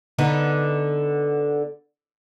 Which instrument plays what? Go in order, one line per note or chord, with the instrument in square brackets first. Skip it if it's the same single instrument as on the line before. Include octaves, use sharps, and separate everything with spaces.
[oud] D3 B3 D#4